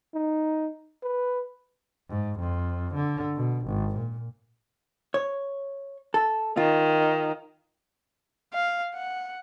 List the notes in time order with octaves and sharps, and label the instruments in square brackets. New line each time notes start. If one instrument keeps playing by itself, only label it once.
[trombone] D#4
B4
[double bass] G#2
F2
D3
B2
G#1
A#2
[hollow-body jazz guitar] C#5
A4
[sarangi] D#3 [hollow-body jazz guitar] F4
[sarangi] F5
F#5